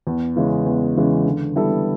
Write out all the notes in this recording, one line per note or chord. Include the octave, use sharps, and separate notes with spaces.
E2
C#3 E3 G#3 C#4
E2
C#3 E3 G#3 C#4
D3
G3 B3 E4 A4